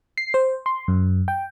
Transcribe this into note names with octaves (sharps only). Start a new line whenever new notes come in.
C7
C5
C6
F#2
G5